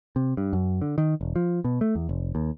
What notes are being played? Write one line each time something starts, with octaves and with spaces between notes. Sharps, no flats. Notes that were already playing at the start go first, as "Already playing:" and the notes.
C3
G2
F#2
D3
D#3
E1
F3
B2
A3
E2
F1
D#2